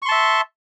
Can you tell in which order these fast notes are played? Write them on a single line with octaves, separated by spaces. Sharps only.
C#6 C6 A5 E5